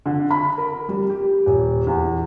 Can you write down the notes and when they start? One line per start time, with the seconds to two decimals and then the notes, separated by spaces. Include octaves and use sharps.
0.06 D3
0.31 B5
0.58 A#4
0.89 G3
1.10 G4
1.46 D#1
1.87 E2